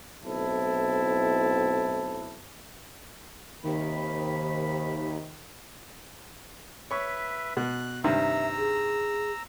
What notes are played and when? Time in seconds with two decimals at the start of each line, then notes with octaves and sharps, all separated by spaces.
0.23 B1 A2 C4 E4 A5
3.63 D#2 C3 D#3 B5
6.91 B4 C#5 E5 C#6
7.57 B2 F#6
8.04 G2 C3 D#3 E5 A#5 E6
8.58 G#4